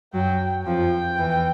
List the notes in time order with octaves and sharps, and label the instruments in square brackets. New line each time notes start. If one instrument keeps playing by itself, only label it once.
[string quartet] F#2 F#3 [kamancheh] G5
[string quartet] F2 F3 [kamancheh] G5
[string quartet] E2 E3